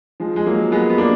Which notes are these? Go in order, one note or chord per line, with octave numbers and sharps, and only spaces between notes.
F3 G#3
G#3
F#3 A#3
G#3 B3
B3
A#3 D4